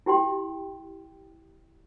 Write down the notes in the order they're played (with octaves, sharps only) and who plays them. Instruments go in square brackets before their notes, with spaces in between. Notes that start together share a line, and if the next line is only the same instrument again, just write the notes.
[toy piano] E4 G4 G5 C6